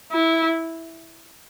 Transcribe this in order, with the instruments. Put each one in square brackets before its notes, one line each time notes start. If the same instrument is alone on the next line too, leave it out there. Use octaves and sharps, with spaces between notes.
[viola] E4